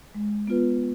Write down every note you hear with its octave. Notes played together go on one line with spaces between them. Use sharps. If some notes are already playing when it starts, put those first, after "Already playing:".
G#3
B3 F4 B4